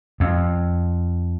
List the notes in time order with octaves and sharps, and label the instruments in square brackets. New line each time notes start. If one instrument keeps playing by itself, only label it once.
[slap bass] F2